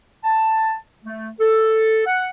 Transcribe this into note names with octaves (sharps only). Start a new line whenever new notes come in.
A5
A3
A4
F#5